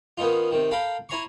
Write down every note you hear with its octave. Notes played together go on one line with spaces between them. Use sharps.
D#3 B3 C#4 D#4 F4
C3 D#3
A4 F5 G5 A#5 B5
E4 C#5 G#5 A#5 C6 C#6